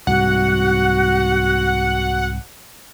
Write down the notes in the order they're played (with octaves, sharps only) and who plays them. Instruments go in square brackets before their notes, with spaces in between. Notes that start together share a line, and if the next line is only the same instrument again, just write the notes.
[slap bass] C2 G#2 [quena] F#4 [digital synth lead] F#5